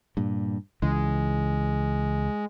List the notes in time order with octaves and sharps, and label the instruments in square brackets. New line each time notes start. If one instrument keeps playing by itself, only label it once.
[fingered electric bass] G2 A#2
[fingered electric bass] C#2 C#3 E3 [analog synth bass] G#3